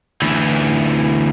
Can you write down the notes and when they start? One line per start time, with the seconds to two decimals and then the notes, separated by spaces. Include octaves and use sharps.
0.22 D2 E3